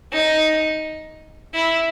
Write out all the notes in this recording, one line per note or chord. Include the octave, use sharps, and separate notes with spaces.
D#4
E4